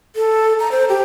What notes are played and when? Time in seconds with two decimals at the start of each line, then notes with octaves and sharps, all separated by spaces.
0.16 A4
0.60 A#5
0.71 C5
0.89 G4